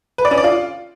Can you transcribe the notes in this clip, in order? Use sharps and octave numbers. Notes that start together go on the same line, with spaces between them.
B4
D5
C#4
D5
F4